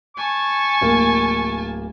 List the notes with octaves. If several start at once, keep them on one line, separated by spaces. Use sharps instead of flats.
G#5 A5 C#6
D1 A#3